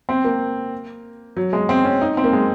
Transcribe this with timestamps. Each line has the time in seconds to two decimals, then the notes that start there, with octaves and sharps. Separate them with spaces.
0.09 C4
0.25 A#3
1.37 F#3
1.53 G#3
1.69 C4
1.85 C#4
2.01 D#4
2.17 C4
2.24 A#3
2.33 G#3